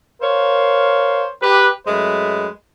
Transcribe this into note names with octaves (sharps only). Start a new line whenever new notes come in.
A#4 C5 C#5 F5
G4 B4
F#2 G#3 A3 B4